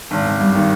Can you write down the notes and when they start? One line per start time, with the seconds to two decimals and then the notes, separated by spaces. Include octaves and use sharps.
0.11 G#1
0.26 G#1
0.40 G2
0.55 D#3